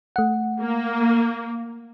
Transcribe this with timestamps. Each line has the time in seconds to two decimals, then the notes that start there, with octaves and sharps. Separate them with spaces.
0.16 A3 F#5
0.61 A#3